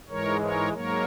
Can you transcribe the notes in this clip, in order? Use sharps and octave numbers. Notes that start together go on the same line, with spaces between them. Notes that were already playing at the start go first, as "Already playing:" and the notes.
G#2 E3 G#3 A#4 C#5
A#4 C#5
G#2 F#3 A#3 A#4 C#5